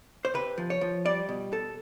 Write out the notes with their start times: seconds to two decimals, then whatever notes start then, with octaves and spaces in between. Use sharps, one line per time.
0.25 C5
0.34 C3 B4
0.58 F3
0.70 C#5
0.81 F3
1.05 G3 D5
1.29 B2
1.52 B2 A4